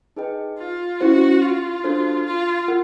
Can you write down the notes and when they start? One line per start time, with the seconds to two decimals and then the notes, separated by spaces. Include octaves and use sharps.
0.16 D#4 G#4 B4 D#5 G5
0.59 F4
1.00 C#4 E4 F#4 G4 C5
1.42 F4
1.84 D4 F#4 A4 C5
2.26 F4
2.68 F4 A#4 F#5